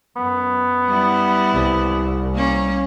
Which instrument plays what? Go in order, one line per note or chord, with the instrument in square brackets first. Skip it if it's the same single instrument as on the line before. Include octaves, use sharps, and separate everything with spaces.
[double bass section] F#2 [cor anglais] B3
[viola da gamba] G3 E4
[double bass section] C2
[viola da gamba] A#3 C#4